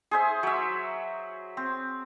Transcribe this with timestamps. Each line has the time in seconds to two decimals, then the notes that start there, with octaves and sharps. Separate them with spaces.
0.11 G#4 C5 E5
0.43 F#3 E5
1.57 C4